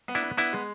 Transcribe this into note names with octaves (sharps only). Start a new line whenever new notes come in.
B3
D4 E4
B3
B3 D4 E4
G#3